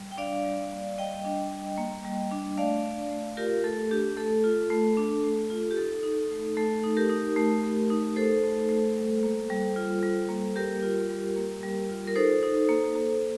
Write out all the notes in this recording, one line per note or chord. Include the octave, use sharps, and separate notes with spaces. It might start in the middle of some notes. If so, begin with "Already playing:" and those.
Already playing: G3
G5
D4 D5 F5
G3
A#3
G3 D#5 G5
D4
G3
A#3
G3
D4
A3 D5 F5
D4
A3
F4 G4 A#4
A3 A4
D4 G4
A3 A4
F4
A3
D4
A3
F4
G4
D#4 A4
D#4
A3
A3 A4
D#4
G4 A#4
D#4
A3
A3
D#4
D#4 A4 C5
A3
A3
G3
A#3
G3
F4
G3
A#3
G3 G4 A#4
F4
G3
A#3
G3
F4
A#4
D#4 A4 C5
D#4
A#3
A#3